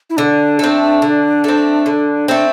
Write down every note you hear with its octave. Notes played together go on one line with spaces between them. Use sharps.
E4
D3 D4
A3 C4
D3
A3 C4
D3
A3 C4